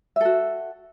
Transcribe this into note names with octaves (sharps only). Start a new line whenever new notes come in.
F#4 A4 E5